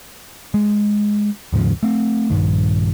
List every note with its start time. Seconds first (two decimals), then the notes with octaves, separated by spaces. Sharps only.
0.54 G#3
1.53 D#2 G#2 C#3 F3
1.83 A3 C4
2.30 A#1 G2 D#3